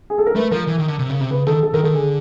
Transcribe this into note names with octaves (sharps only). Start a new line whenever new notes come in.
G#4
A4
A#4
A3 B4
F3 A#4
E3
D#3
D3
C3
C#3
C3
C#3 B4
D#3 A4
A4
D#3 A#4
D#3 A4
D3 G#4